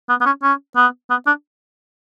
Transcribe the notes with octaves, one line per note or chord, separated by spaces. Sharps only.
B3
B3
C#4
C#4
B3
B3
D4